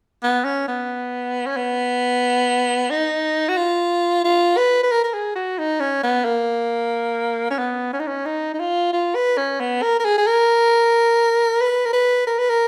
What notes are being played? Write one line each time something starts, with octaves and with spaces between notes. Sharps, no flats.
B3
C#4
B3
C#4
B3
D#4
F#4
F4
F4
B4
B4
A#4
A#4
G#4
F#4
D#4
C#4
B3
A#3
C#4
B3
C#4
D#4
C#4
D#4
D#4
F4
F4
B4
C#4
B3
A#4
A#4
G#4
G#4
A#4
B4
A#4
B4
A#4
B4
A#4